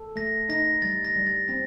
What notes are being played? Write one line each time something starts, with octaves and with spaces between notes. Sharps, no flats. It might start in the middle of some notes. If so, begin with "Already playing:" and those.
Already playing: A4
A3 A#6
D#4 A#6
G3 A6
A#6
G3
A6
C4 A#6